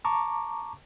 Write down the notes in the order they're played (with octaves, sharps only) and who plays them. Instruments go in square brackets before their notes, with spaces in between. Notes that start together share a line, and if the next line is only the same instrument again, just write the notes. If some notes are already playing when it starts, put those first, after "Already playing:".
[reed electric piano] A5 A#5 C#6 D6